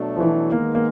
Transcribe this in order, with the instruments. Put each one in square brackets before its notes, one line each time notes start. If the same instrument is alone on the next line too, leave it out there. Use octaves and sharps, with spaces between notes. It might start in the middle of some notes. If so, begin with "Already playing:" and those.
Already playing: [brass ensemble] B2 F#3 A3 D4
[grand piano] F3
E3
[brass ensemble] D#3 G#3 B3 [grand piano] A#3
[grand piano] A#3